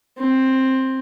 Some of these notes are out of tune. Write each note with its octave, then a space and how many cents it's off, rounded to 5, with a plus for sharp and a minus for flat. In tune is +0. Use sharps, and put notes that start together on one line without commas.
C4 +10